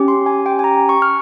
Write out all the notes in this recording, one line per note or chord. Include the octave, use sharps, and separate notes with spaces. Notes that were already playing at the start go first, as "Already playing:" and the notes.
Already playing: C#4 G4
C6
G#5
G5
G#5
A#5
C#6
F6